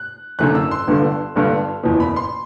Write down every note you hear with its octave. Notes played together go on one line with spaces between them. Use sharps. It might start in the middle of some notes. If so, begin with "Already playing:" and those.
Already playing: F#6
F#1 F#2 D3 F#6
E6
C6
G1 G2 D3
G1 G2 D3
F#1 E2 B2
B5
C6